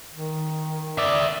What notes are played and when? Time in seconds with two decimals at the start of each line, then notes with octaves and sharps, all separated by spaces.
0.14 D#3
0.98 D5 E5